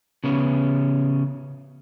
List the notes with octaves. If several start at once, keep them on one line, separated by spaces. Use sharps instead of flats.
C#3 B3 C#4